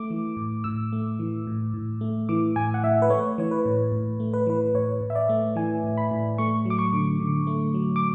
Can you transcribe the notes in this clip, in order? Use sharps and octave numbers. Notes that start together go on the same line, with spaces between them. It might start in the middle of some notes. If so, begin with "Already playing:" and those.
Already playing: A3 D6
E3
A2
A2 E6
A3
E3
A2
A2
A3
E3 D6
A2 G#5
F#5
A2 E5
B4
A3 C#5
E3 C#5
B4
A2
A2
A3
B4
E3 B4
A2 C#5
A2
E5
D5
A3
E3 G#5
A2
B5
A2
A3 C#6
F#3 D6
C#6
D3
D3
A3
F#3
D6